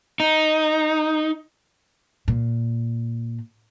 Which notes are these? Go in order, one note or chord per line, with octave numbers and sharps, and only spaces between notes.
D#4
A#2